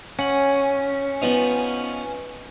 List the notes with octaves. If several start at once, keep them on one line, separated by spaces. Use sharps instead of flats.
C#4 F#5
F3 B3 D#4